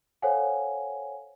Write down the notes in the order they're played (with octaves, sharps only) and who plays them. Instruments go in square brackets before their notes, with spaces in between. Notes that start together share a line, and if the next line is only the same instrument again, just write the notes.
[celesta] A4 C5 C#5 F5 F#5 G#5